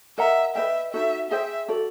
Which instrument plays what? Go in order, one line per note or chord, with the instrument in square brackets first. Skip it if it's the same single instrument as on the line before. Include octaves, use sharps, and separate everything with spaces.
[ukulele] A#4 D#5 F#5 A#5 [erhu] E5
[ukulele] B4 D#5 G5 [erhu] E5
[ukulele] D#4 F#4 A4 [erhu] E5
[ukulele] G#4 C5 D#5 G5 [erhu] E5
[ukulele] F#4 A4 D5